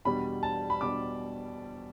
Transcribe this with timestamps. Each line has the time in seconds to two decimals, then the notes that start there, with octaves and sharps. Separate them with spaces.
0.05 E2 B2 G3 D4 B5
0.43 A5
0.70 B5
0.81 B2 G3 D4 D6